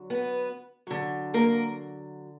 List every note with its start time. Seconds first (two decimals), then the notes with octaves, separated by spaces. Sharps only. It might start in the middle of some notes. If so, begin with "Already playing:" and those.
Already playing: D3 F#3
0.10 B3 B4
0.87 D3 F#3
1.34 A#3 A#4